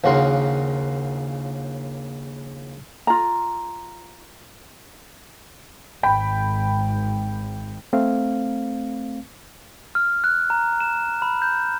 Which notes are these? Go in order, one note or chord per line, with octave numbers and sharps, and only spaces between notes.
A#1 D#2 C#3 F#4 A#4 C6
F4 A#5
G#1 G5 B5
A3 C4 F5
F6
F#6
A#5
E7
B5
G6